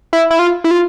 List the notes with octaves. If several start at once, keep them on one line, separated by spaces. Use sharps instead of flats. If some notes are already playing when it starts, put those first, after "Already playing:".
E4
E4
F4
E4
F4